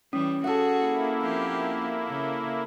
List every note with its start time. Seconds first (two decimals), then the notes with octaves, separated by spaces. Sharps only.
0.13 E3 G3 C#4
0.44 F#4 G#4 A4 F#5
0.78 A#3 E4
1.21 F3 C4 G4
2.08 C#3